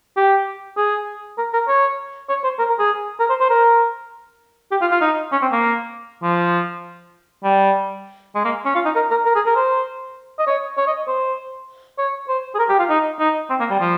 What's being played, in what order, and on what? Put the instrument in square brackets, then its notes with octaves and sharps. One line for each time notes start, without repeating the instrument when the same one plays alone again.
[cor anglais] G4
G#4
A#4
A#4
C#5
C#5
C5
A#4
A#4
G#4
A#4
C5
C5
A#4
G4
F4
F4
D#4
C#4
C4
A#3
F3
G3
G#3
A#3
C#4
F4
D#4
A#4
A#4
A#4
G#4
A#4
C5
D#5
C#5
C#5
D#5
C5
C#5
C5
G#4
A#4
G4
F4
D#4
D#4
C4
A#3
G3
F3